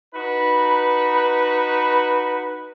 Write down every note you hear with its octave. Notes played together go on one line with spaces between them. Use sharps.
D#4 F#4 B4